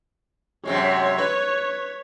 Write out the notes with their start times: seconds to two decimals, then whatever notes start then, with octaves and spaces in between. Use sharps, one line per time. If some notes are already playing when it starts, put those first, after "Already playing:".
0.65 F#2 C3 G#3 C#5
1.18 B4